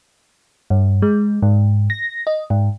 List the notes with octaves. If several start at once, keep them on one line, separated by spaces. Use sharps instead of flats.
G2
G#3
G#2
A#6
D#5
G#2